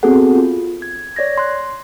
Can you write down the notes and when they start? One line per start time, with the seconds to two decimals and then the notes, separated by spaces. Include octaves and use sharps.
0.03 B3 C4 F#4 G#4 A4 F#5
0.35 F4
0.82 G#6
1.16 C#5 D5 G#6 A#6
1.38 C6 F#6